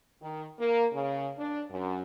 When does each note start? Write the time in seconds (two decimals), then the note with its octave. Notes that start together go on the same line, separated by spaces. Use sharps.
0.23 D#3
0.60 A#3
0.94 C#3
1.39 D4
1.71 F#2